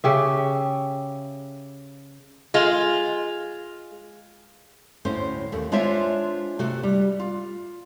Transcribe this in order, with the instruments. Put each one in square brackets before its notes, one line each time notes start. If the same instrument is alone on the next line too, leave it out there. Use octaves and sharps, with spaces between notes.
[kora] C#3 G4 E5
[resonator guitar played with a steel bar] G#3 F4
[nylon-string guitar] D2 A2 C#4 C5
D#2 A3
G#3 D4 F4 C5 C#5 E5
C3 A3 F#4
G3
F4